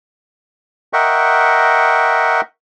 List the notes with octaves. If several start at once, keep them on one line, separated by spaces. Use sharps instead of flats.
A#4 D#5 E5 F#5 G5 C#6